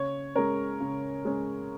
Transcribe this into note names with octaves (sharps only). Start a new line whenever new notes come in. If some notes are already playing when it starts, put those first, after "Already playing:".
Already playing: C#3 C#5
G#3 C#4 A#4
C#3
G#3 C#4